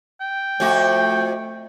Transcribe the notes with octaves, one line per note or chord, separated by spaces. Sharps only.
G5
F2 A3 F#4